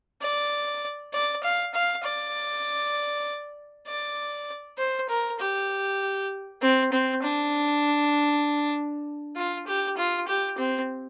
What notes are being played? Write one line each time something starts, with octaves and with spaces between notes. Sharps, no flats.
D5
D5
F5
F5
D5
D5
C5
A#4
G4
C4
C4
D4
F4
G4
F4
G4
C4